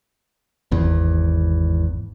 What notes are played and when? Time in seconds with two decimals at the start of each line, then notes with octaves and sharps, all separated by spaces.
0.71 G#1 E2